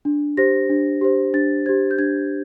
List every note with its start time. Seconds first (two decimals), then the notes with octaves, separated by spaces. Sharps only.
0.05 D4
0.37 G4 C5 A#6
0.70 D4
1.01 G4 C5
1.34 D4 A6
1.66 G4 C5 G#6
1.91 G6
1.98 D4 G#6